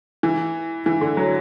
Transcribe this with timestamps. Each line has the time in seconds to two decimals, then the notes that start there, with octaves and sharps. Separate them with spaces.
0.23 E3
0.86 E3
1.01 D3
1.17 F#3